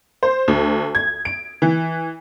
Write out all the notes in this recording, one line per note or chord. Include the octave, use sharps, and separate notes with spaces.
C5
D2
G#6
D7
E3